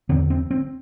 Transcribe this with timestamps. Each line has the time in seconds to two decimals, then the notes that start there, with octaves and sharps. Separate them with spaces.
0.09 E2 D3 C4
0.30 C4
0.51 C4